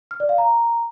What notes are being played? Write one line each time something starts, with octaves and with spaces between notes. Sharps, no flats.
F6
D5
F5
A#5